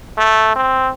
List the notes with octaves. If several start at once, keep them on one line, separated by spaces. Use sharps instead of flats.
A3
C4